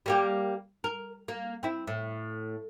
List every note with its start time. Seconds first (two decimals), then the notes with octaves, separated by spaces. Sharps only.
0.06 G3 A#3 G4
0.84 A#4
1.28 A#3
1.63 C4 E4
1.87 A2